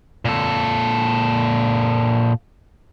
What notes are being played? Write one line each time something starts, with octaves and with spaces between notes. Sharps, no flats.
A#2 A4